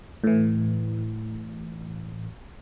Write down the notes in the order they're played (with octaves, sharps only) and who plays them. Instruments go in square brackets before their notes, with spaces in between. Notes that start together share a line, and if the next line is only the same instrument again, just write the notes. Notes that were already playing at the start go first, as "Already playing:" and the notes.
[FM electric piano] A2 E3